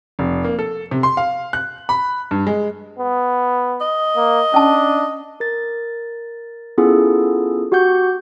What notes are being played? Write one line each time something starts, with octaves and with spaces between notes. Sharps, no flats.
F1
A#3
A4
C3
C6
F5
F#6
B5
G2
G#3
B3
D#5
A#3
C#4 D4 A5
A#4 A6
B3 C#4 E4 F4 G#4 A4
F#4 G4 F#5 C#6 G6